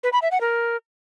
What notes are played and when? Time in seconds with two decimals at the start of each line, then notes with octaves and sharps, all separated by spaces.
0.03 B4
0.13 B5
0.22 E5
0.31 F#5
0.41 A#4